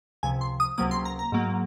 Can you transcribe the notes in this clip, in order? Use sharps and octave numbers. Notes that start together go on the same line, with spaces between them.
C#2 C3 F3 G#5
C6
D#6
C#2 C3 F#3 A#3 D#6
C6
A#5
A#5
G#2 F#3 A#3